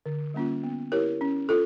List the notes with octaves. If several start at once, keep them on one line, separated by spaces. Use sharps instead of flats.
D3
G3 A#3 C#4 F4
B3
E4 G4 A#4 C#5
C#4
F4 A4